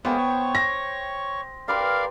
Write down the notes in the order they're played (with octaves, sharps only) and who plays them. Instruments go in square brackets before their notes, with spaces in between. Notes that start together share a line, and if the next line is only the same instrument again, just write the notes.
[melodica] G#3 A#3 [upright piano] B3 [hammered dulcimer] C5 G5
[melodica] C#5 C#6
[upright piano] A#6
[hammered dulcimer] G4 B4 C6 [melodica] A#4 D5 F5